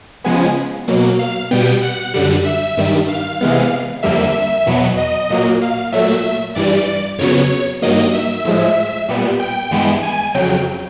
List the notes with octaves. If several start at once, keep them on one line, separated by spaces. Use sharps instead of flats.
C#3 F3 G#3 B3 G#5
B2 F#3 A#3
F5
B2 G3 B3 G5
F#5
F#2 D3 G3
E5
G2 D#3 G3
F5
C3 E3 G#3 B3
F2 D3 G3 A#3 E5
E2 B2 F#3 B3
D#5
A#2 F#3 A#3
F5
A#2 F#3 A3 E5
G2 E3 G3 D5
F2 C#3 F#3 B3 C#5
G2 D#3 F#3 A#3 D#5
E5
A2 F3 G#3
A#2 G3 B3
G5
G2 E3 G#3 B3
G#5
F2 C#3 F#3 G5